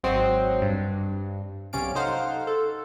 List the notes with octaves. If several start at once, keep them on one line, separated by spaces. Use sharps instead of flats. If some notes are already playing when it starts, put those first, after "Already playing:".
G#1 F#3 C4 D#5 F#5 C7
G2
B1 C3 C#4 D5 F5 D7
D#4 A4 C5 F5 F#5
A4